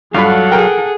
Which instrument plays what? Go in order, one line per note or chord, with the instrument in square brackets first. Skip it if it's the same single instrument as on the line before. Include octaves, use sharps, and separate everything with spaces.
[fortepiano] G2 F4 B5 [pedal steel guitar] F#3 F5 [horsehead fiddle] A4 F#5
[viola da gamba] G#4 [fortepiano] A#4 G5